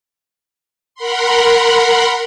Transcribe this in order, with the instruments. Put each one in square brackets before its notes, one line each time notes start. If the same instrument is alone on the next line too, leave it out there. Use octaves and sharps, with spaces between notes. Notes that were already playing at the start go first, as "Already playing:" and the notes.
[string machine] A#4 F#5 B5 C6